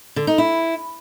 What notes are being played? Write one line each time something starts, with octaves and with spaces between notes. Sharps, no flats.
D3
D#4
E4